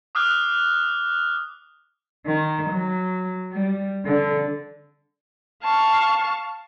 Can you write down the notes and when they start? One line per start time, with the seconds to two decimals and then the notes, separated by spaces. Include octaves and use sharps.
0.15 D6 D#6 F6 F#6
2.26 D#3
2.70 F#3
3.52 G3
4.04 D3
5.63 F5 A5 C#6